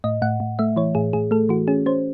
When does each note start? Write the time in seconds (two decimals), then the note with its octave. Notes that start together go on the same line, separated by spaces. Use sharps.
0.04 A2 D#5
0.22 A2 F#5
0.40 A2
0.59 A3 E5
0.76 E3 C#5
0.95 A2 G#4
1.13 A2 G#4
1.31 A3 A4
1.49 E3 F#4
1.68 C#4 G#4
1.86 C#4 C5